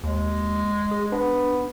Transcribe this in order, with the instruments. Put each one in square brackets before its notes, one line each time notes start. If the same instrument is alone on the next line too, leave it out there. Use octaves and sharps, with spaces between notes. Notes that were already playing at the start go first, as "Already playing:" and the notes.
[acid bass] D#2 [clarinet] G#3
[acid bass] G#4
[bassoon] B3 [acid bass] D4